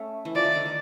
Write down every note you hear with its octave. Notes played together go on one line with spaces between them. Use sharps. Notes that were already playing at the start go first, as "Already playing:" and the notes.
Already playing: A3 C#4
E3
F3 D5
D#3
D3
D#3